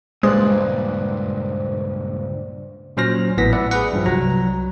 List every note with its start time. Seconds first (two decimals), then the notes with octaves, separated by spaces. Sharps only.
0.23 C#2 G2 A#2 G#3 C5 D5 F#6
2.97 A#2 F#3 C#4 C5 F6 A#6
3.37 A1 A2 E3 B3 A#6 B6
3.53 B4 D5 E5 F#5
3.71 G#4 B4 F#5
3.93 G2 F3
4.06 C2 F#3 A#5